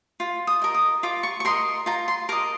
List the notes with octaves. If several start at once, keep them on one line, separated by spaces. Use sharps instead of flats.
F4
D#6
A#4 D#5
D#6
F4 D6
C#6
C#6
A#4 D#5 C6
F4 A#5
C6
A#4 D#5 D6